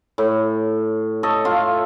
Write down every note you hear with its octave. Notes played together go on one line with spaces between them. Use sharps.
A2
A4 C#5 D#5
F4 A4 E5 F5